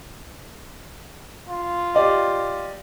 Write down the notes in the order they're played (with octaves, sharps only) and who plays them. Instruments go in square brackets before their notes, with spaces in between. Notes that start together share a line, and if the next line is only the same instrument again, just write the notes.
[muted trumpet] F4
[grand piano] G4 D5 D#5